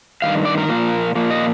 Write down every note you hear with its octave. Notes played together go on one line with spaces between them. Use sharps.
G2 D#3 F5
D5
A#4
A#2 F3 A#3
A#2 F3 A#3
D#5